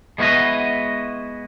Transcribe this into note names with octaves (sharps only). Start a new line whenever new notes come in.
G#3 B3 E4 F#4 B4 D#5